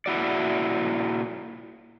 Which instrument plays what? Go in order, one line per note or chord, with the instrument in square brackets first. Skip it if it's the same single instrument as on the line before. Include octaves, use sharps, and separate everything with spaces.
[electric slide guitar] A#2 E4 F#4 D5